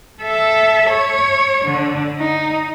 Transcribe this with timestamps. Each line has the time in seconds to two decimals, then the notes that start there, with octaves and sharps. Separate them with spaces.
0.22 A4 E5
0.89 C#5
1.65 D3
2.18 D#4